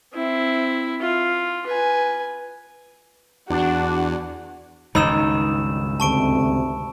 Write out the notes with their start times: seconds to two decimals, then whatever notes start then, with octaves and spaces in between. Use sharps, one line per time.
0.14 C4 E4
1.02 F4
1.67 B4 G#5
3.50 E2 D4 F#4
4.95 C#2 G2 D#3 D#4 B5 E6 E7
6.00 D2 C3 A5 C#6 D7